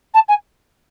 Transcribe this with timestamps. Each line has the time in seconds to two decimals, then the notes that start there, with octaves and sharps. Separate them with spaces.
0.14 A5
0.28 G#5